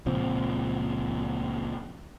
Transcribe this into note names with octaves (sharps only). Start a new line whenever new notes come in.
C#2 A#2 F3 C4